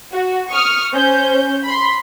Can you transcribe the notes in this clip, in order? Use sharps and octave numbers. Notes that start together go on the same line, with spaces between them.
F#4
C#6 D#6 F6
C#4 C5 G6
B5 C6